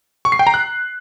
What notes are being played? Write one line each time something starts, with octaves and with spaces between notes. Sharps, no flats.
C#6
C7
G5
A#5
F#6